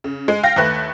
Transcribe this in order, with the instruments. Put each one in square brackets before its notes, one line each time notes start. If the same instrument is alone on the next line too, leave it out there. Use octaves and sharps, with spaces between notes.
[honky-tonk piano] C#3
G#3
F5 G5 A#6
D#2 A3 B4 F#6